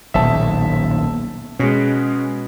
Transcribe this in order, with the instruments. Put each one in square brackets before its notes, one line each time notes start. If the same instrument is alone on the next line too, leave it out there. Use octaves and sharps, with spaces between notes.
[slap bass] D#1 B1 [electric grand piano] E5 A5
[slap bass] B2 [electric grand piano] G#3 C#4